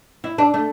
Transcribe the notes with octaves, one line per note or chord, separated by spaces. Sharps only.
E4
D4
A3